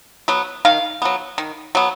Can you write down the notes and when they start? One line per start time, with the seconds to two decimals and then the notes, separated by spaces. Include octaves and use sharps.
0.28 F#3 B3
0.65 D#3 F5
1.02 F#3 B3
1.38 D#3
1.75 F#3 B3